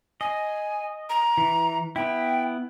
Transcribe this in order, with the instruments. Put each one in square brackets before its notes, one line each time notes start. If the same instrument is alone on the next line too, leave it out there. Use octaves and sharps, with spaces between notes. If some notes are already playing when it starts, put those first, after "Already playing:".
[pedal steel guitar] D#5 [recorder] G#5
[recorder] A#5
[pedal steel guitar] E3
[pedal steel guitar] B3 E4 [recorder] G5